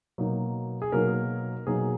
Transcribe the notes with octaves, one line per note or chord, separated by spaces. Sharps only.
B2 F#3 A#3 D#4
G#4
B2 F#3 A#3 D#4 A#4
B2 F#3 A#3 D#4 G#4